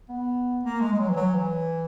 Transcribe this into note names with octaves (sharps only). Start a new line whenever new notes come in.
B3
A#3
G#3
G#3
F#3
E3
F#3
E3